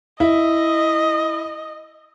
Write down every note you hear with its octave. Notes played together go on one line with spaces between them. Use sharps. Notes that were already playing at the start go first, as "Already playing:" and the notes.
E4 D#5